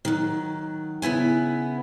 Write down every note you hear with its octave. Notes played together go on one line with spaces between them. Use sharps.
D#3 F#3
C#3 B3 E4 G#5